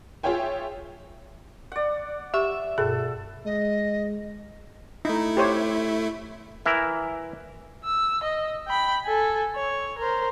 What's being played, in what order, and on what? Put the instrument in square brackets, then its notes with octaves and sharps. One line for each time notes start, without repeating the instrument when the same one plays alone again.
[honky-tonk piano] F4 G#4 C#5 E5 G5 G#5
[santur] D5 F#5
[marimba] G4 C#6 [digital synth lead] E5
[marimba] G2 B2 G#4 [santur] A4
[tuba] G#3 [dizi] D#5
[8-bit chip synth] A3 E4 [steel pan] D#4
[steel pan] G4 C5 C#5
[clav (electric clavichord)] E3 E4 A#4
[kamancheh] E6
D#5
G5 B5
A4 G#5
C#5
A#4 C5